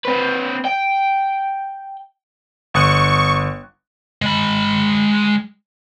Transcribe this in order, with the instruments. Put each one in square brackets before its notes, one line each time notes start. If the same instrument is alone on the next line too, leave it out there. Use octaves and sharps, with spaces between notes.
[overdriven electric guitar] C4 B4
G5
[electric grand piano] G1 D#6 F#6 [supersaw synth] C#6
[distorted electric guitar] G#3 B5